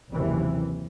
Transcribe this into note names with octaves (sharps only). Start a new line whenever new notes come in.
F#1 D#2 C3 E3